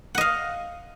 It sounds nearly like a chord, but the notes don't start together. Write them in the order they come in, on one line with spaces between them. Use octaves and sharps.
F#5 D#5 F5